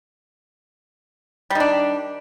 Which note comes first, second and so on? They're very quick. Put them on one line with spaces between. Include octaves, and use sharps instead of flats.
G3 D#3 D4